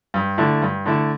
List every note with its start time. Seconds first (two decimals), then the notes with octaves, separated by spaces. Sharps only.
0.14 G2
0.38 D3 A3 E4
0.62 G2
0.86 D3 A3 E4